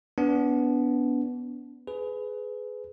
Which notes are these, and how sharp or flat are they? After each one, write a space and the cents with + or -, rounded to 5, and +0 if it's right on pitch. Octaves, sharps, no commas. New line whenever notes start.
B3 +0 D4 -30
G#4 +20 B4 +20